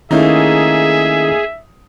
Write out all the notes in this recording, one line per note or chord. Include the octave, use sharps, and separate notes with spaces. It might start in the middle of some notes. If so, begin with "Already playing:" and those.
D#3 A3 A#3 C#4 D#4 E4 G#4 E5